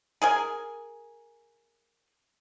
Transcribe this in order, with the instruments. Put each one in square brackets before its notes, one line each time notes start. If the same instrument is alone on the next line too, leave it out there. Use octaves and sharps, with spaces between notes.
[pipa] G#4 A#4 G#5